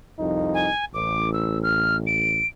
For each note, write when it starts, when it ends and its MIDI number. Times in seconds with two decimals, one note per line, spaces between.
0.19 0.69 36
0.19 0.69 41
0.19 0.69 63
0.54 0.85 80
0.94 2.38 33
0.94 1.33 86
1.33 1.59 88
1.63 1.97 89
2.07 2.47 98